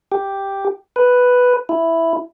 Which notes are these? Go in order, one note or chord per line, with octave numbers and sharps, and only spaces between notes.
G4
B4
E4